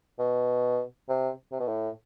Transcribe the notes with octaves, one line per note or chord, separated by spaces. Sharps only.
B2
C3
C3
B2
A2